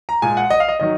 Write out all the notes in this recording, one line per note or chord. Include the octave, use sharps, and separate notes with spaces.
A#5
A#2 G#3 G#5
F#5
D#5
F5
D#5
D#3 F#3 D#5